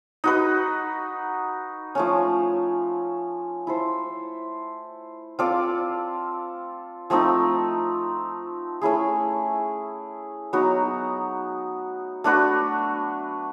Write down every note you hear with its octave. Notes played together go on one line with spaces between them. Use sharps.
D#4 F#4 B4
F3 A3 C#4
E4 A4 C5
C4 F4 A4 D5
F3 A3 C4 D#4
A3 C#4 E4 G#4
F#3 B3 D#4 F#4
A3 D4 F#4 B4